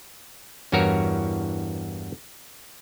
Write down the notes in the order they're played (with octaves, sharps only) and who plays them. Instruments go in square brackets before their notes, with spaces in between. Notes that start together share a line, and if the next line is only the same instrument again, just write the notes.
[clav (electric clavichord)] E2 G2 E3 F#4 A#4 C#5